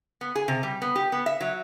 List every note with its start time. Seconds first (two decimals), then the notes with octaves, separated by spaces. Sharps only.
0.21 B3
0.35 G#4
0.48 C3
0.63 G3
0.82 B3
0.96 G4
1.12 B3
1.26 E5
1.41 F#3